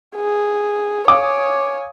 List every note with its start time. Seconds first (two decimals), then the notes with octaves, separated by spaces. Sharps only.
0.16 G#4
1.08 C#5 F5 G#5 D6 D#6